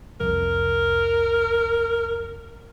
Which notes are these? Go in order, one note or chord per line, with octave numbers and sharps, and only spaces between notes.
C2 F2 A#4